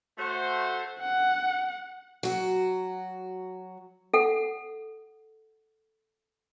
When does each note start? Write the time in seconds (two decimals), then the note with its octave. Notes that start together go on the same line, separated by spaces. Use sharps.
0.18 A3 F#4 C5
1.00 F#5
2.23 F#3 F#4
4.14 A4 F#5